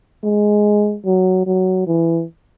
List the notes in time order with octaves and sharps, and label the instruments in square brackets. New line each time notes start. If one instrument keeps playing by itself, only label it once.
[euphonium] G#3
F#3
F#3
E3